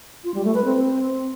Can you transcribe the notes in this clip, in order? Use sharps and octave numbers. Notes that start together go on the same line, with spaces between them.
F4
G3
A3
B4
C4